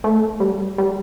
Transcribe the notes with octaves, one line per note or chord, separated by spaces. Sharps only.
A3
G3
G3